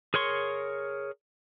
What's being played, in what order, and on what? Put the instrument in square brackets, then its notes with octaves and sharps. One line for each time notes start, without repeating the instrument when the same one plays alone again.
[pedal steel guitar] G#4 A#4 C#5 C6 C#6